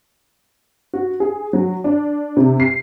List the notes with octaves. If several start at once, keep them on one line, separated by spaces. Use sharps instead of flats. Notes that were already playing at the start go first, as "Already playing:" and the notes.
F#4
G#4
F#3
D4
C3
C7